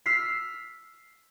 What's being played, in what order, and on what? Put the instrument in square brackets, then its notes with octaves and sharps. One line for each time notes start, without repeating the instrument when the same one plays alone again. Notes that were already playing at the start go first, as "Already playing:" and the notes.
[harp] E6 F6 B6 C7